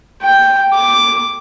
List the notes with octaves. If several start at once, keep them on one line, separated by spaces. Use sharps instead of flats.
G5
D6